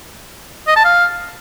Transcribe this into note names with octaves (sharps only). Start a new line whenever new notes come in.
D#5
A5
F5